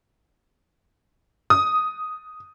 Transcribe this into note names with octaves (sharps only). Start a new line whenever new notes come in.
D#6